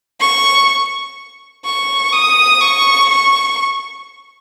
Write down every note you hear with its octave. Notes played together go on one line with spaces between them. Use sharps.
C#6
C#6
D#6
C#6
C#6